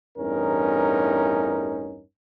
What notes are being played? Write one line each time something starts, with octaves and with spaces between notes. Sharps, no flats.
A1 E2 G2 C#4 D#4 A#4